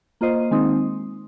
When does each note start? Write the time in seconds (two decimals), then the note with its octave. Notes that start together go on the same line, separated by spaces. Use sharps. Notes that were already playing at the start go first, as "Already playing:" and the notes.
0.21 A#3 F4 C5 D#5
0.51 D#3 G#3 C4 D#4